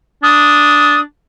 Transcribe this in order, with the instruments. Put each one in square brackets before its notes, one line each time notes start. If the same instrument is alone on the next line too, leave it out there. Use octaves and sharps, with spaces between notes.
[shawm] D4 [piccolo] D#6